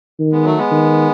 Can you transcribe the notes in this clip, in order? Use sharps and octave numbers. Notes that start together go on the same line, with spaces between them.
D#3
G#3 B3
F#3 A3
G#3 B3
D#3